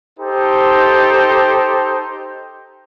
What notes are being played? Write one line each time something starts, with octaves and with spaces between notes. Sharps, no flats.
D#4 G4 A4 C5